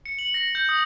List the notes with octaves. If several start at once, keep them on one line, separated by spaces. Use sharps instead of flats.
C#7
F#7
A#6
G6
D#6